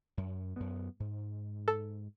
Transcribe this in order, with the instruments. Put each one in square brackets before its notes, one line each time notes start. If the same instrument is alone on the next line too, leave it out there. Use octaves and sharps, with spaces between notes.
[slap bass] F#2
F#2 B3
G#2
[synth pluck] A4